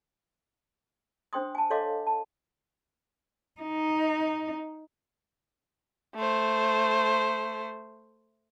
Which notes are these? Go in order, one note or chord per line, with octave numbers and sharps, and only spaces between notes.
D4 C5 G5 C6 D#6
G#5 A5
A4 C#5 D#5 F5 C6 D6
A5
D#4
A3 C5